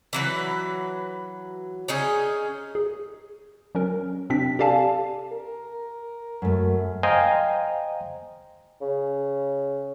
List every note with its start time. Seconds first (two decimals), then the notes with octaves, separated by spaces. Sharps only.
0.13 E3 F#3 B4
1.88 C#4 D#4 G#4
2.75 G#4
3.75 F#3 C#4 A#4
4.30 C3 C4 D4 B6
4.59 G4 A4 D5 F5 G#5 A5
5.32 A#4
6.42 F#2 A3
7.03 C5 D#5 F5 G5 G#5 A#5
8.82 C#3